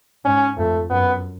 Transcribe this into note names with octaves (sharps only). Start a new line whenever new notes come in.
G#2 C#4
F2 A3
F#2 B3